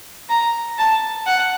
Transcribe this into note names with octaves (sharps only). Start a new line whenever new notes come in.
A#5
A5
F#5